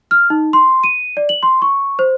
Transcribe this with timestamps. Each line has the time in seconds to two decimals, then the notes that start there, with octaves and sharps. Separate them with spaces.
0.11 F6
0.30 D#4
0.53 C6
0.84 D#7
1.17 D5
1.29 F#7
1.43 C6
1.62 C#6
1.99 C5